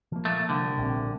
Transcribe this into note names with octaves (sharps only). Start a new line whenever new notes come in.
F3 A#3
A#2 A3
C2 A2 D3
A#1 C3